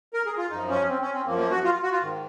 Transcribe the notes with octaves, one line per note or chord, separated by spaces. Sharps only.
A#4
G#4
F4
F#2 F3 D#4
C#4
C4
C#4
C4
F#2 F3 A#3
A#3
F#4
F4
F#4
F4
G#2 D#3